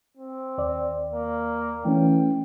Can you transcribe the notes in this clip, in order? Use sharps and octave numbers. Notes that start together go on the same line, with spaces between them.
C4
D#2 D5
A#3
E3 A3 C#4 G5